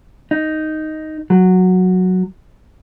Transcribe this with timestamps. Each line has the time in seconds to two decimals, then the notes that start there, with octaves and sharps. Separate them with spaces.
0.31 D#4
1.30 F#3